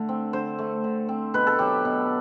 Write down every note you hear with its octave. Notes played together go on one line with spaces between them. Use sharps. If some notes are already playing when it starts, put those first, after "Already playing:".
Already playing: D3 A3
C4
D3 C5
A3
D3
C4
B2 B4
A4
F#3 G4
B2